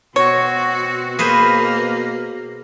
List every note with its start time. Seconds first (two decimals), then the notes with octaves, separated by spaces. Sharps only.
0.16 B2 C4 F#4 C#5
1.19 A#3 G#4 B4 C5